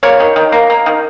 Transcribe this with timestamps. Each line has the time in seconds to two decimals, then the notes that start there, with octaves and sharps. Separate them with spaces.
0.03 A#3 C#5
0.20 D#3
0.36 D#3
0.52 A#3
0.70 A#3
0.86 D#3